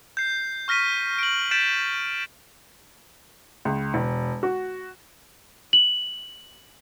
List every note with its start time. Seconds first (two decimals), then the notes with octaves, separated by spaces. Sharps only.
0.17 G6 C7
0.68 C#6 F6 A#6 B6 D#7
1.19 D7 F#7
1.51 G6 A6 B6 D7 E7
3.65 C#2
3.94 E1
4.43 F#4
5.73 F#7